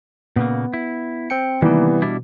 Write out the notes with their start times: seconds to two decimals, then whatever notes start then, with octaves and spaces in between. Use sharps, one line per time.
0.36 A#2 C#3 A#3 B3
0.74 E4
1.30 C4 G5 C#7
1.62 C3 D#3 E3 G3 A#3 B3
2.02 B2 G3 D4 E4